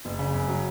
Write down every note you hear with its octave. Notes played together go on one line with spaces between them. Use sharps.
F#1
C#3
F#2
F#3